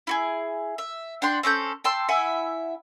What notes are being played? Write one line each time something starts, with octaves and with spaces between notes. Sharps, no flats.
E4 F#4 G#4
E5
D4 F#5 G5 C6
C4 C#4 A4 G6
G5 A5 C6 E6
E4 E5 F#5 G#5